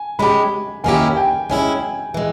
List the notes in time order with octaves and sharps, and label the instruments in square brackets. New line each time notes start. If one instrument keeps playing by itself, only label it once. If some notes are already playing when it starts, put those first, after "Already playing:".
Already playing: [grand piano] G#5
[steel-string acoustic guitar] G#3 C#4 G4 [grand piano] B5
[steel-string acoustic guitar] D#3 A#3 C#4 E4 G4 [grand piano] G#5
[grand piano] G5
[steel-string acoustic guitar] G#3 C#4 E4 [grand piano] G#5
[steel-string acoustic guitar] E3 G#3